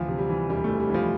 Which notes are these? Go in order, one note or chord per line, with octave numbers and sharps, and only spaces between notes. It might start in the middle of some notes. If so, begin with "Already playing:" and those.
Already playing: D2 E3 F3
C3
G3
E3
E1 G3
E3 A3
G3
E3 F3